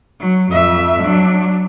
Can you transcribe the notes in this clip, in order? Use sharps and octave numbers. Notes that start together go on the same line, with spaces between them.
F#3
F2 E5
F#3 D4